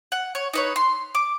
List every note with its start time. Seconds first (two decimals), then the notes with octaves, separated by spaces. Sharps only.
0.12 F#5
0.35 C#5
0.53 D#4 B4 C#5
0.76 C6
1.15 D6